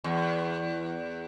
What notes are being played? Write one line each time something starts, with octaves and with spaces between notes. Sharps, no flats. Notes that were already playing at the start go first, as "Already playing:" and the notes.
E2